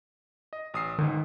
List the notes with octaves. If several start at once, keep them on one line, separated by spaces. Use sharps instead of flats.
D#5
A1 D#6 C7
C#2 G#2 D#3